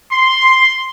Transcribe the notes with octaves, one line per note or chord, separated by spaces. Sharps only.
C6